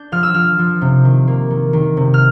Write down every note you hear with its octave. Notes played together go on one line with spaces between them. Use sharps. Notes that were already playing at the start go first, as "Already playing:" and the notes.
Already playing: D4 G6
F3 F6
E6
F3 F6
F3
C3
D#3
A#3
D#3
D#3
C3
F6